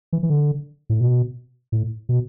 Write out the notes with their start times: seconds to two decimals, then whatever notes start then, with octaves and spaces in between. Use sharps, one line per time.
0.13 E3
0.23 E3
0.30 D3
0.90 A2
1.01 B2
1.72 A2
2.09 B2